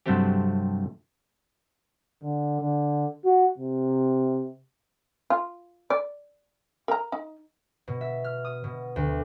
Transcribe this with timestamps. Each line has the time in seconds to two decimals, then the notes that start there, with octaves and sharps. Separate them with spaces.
0.06 G2 C3 F#3 A3 C4 G4
2.23 D3
2.60 D3
3.25 F#4
3.58 C3
5.30 F4
5.90 D5
6.88 A#4 A#5
7.12 D#4
7.88 B2
8.01 E5
8.24 F6
8.45 D#6
8.64 B2
8.96 D2